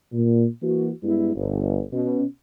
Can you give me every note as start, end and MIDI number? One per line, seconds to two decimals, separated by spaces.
0.12 0.45 46
0.62 0.90 52
0.62 0.90 58
0.62 0.90 66
1.03 1.35 43
1.03 1.35 56
1.03 1.35 59
1.03 1.35 64
1.35 1.83 31
1.93 2.23 47
1.93 2.23 61